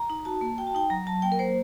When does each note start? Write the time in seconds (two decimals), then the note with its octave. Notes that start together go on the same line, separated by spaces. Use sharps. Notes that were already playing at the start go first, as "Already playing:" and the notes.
Already playing: A#5
0.10 D#4
0.25 F#4 A5
0.41 A#3
0.58 F#4 G5
0.67 A5
0.75 D#4 G5
0.90 F#3 A#5
1.07 F#3 A5
1.22 A#3 G5
1.32 A#4
1.39 A#3 C5